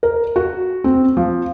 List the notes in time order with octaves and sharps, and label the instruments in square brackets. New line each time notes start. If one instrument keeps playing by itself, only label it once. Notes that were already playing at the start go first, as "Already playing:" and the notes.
[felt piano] A#4
F#4
C4
F3